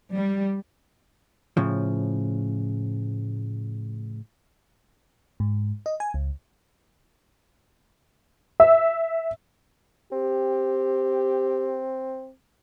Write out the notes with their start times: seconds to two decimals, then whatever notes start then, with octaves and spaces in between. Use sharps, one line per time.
0.13 G3
1.57 A2 C#3 F3
5.40 G#2
5.86 D#5
6.00 G#5
6.14 C#2
8.60 E5 E6
10.12 C4 G4